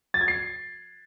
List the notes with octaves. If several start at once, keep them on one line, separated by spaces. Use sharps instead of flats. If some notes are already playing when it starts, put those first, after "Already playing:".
A6
G#6
C7